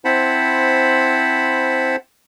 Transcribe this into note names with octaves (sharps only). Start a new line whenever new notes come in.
C4 E4 C5 F#5 A5 B5